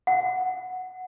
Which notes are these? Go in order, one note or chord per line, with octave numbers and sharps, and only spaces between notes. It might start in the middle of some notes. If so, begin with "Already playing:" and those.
F#5